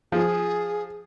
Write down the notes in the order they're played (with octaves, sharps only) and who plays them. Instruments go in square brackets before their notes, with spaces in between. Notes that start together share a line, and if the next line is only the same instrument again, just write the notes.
[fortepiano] F3 [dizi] G#4